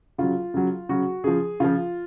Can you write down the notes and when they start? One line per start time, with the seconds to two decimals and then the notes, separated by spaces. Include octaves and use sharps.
0.18 C#3 F#3 F4
0.54 C#3 F#3
0.89 C#3 F#3 F#4
1.24 C#3 F3 G#4
1.60 C#3 F3 F4